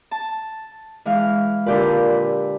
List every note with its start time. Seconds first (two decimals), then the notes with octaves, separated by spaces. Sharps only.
0.11 A5
1.05 E3 G#3 F5
1.66 A#2 D3 G4 B4